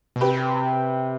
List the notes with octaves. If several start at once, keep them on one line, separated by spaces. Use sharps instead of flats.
B2
C3 G4 B4